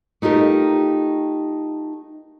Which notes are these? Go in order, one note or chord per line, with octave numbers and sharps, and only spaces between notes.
A3 D#4 F4 G4 A#4